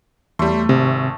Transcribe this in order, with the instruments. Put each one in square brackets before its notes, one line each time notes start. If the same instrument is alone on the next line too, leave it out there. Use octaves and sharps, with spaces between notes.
[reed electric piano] E2 [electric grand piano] G3 C6 [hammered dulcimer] A3
[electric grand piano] G#1 [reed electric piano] C3